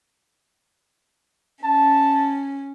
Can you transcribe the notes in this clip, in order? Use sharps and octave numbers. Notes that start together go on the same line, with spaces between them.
C#4 A5